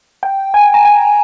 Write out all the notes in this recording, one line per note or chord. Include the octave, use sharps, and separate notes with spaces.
G5
G#5
A#5
G#5